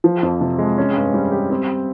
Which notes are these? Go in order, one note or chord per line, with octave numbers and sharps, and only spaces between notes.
F3
F2
C3
G#3
C#4
G2
G3
G4
C4